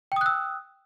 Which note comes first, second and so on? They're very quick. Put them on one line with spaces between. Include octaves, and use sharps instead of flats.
G5 D#6 F#6 E6